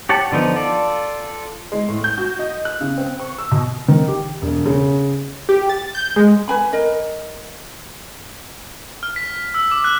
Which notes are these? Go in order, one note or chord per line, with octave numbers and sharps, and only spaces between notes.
G4 C#5 F#5 A5
D3 F3 B3 D#4
F4 A4 D5
G#3
A2
G6
F#4
D#5
F#6
C#3
C4
C#6
E6
B2
D#3
G4
E1
C#3
G4
A6
G6
G#3
B4 G#5 B5
A#4 D#5
F6
B6
E6
D6
F#6